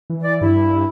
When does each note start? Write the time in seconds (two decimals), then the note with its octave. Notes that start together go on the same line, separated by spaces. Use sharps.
0.10 E3
0.23 D5
0.41 G2 E4
0.73 G2